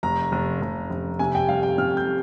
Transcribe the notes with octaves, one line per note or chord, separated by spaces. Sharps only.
F1 A#5
F1
F1
F1
C3 G#5
G5
G3 F5
G5
F2 F6
G6
G3